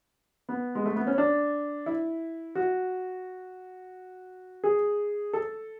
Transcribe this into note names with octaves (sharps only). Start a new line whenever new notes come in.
B3
G#3
A3
B3
C#4
D4
E4
F#4
G#4
A4